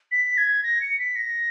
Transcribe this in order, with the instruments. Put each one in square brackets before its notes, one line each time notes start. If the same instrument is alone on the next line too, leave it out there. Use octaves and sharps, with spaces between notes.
[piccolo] B6
G#6
A#6
C#7
B6
A#6